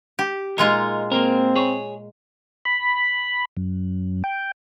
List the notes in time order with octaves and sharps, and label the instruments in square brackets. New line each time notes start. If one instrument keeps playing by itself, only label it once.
[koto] G4
[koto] A#2 G#3 F4 [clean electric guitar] D#4 A#4
[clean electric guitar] A#3 A#4 [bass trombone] C4
[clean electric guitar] G#4 C#5
[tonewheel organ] B5
F#2
G5